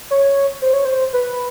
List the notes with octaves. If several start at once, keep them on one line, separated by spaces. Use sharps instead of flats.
C#5
C5
C#5
C5
B4